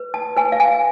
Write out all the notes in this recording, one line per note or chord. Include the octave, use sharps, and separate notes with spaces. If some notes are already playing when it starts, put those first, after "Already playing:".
Already playing: B4
A5
B4 G#5
F5
G#5